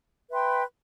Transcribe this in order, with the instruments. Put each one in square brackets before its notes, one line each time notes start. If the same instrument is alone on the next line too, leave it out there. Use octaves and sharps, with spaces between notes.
[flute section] B4 E5 G5 C6